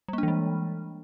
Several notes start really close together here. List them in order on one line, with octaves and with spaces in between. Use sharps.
G3 A#3 D4 E3 G#3